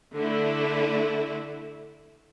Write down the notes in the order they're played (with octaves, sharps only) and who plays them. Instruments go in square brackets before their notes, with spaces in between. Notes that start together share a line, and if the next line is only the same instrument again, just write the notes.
[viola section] D3 A3 E4